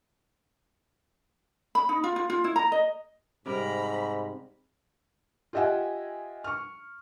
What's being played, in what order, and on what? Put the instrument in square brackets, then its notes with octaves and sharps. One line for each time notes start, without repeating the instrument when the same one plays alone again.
[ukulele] B5
D#4
F4
F4
F4
E4
A#5
D#5
[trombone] G#2 [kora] C3 G3 A#4 [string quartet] A#5 B5
[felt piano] F4 G4 D#5 E5 F#5 G#5
C#6 F6